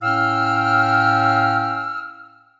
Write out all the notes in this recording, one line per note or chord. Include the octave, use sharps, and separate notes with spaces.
A2 C#4 F5 G5 E6 F6